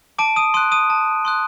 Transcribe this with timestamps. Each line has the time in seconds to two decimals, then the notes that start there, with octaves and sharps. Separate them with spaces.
0.19 A5 D6 D7
0.36 D#6 D#7
0.54 C6 D#6 F#6 D#7
0.72 D#6 D#7
0.90 A5
1.25 C6 D#6 F#6